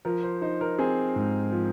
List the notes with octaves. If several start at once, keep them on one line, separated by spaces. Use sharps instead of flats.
F3 A#4
C5
D#4 C5
A#4
C4 G#4
G#2
F3